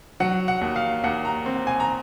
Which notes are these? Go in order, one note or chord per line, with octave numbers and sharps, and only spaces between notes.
F#3 F#5
F#5
D#2
F5
D#2 F#5
A#5
C4
G#5
A#5